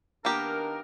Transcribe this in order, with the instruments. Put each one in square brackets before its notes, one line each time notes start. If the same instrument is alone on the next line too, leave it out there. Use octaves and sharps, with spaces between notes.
[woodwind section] D#3 D4 A#4 [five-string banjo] A#3 B3 G4